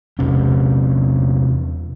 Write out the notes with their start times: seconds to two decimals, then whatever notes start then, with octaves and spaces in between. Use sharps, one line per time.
0.19 E2 C3 C4 C#4